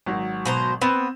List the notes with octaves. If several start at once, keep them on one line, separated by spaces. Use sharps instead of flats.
G#1 F#3
B2 C5 A#5
B3 C4 E7